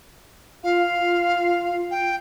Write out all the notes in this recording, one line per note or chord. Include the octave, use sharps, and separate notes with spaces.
F4 F5
G5